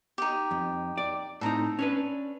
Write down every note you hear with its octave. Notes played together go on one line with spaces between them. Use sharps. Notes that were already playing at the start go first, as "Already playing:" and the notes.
D#4 G4
F2
D5
A2 C4 D#4 A4 A#5
C#4 D4 B4